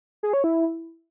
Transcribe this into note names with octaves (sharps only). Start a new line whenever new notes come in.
G#4
C#5
E4